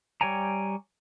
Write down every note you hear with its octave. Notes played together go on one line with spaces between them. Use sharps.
G3 C#5 G5 G#5 A#5